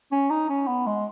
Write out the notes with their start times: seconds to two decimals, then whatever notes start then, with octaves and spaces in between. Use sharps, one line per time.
0.11 C#4
0.30 D#4
0.49 C#4
0.67 B3
0.86 G#3